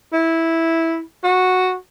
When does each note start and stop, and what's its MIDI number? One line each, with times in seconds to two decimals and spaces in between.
0.13 1.00 64
1.23 1.75 66